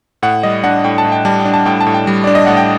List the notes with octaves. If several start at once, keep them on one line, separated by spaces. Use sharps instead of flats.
A2 F#5
G3 D#5
D4 F#5
A2 G5
A5
A2
G5
G3 A5
G5
D4
A5
A2 G5
A5
A2
G5
G3
D4 D5
D#5
A2 F#5
G5